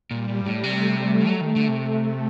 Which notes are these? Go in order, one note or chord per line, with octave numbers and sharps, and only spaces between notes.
A#2 G3
A#2
G2
A2
C3 A3
F#3
D#3
D3
C3 A3